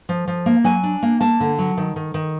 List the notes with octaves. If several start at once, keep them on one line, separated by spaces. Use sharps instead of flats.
F3
F3
A#3
F#3 G#5
D4
A#3
A#3 A5
D3
F#3
D#3
D#3
D#3